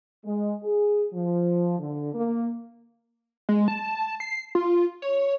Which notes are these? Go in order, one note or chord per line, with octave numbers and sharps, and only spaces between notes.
G#3
G#4
F3
D3
A#3
G#3
A5
C7
F4
C#5